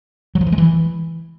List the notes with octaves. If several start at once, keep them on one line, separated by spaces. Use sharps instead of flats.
F#3
F3
E3
G#3
E3